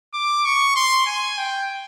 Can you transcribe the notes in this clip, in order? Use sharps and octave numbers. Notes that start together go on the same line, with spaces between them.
D6
C#6
C6
G#5
G5